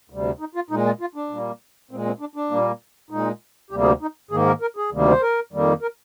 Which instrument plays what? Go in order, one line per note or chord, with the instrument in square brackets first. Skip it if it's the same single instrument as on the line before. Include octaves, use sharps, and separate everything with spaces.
[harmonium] D2 C3 G3
D#4
F4
A#2 G#3 D#4
F4
F4
D4
A#2 G3 A#3
A#2 G#3 C4
C4
D4
D4
A#2 G3 A#3
A#2 G#3 D#4
D2 C3 G3 A#3 G4
G#4
G4
D#4
G#2 D#3 A#3 G#4
A#4
A#4
G#4
D2 C3 D#3 G3 A#3
C5
A#4
F2 D#3 G3 A#3
A#4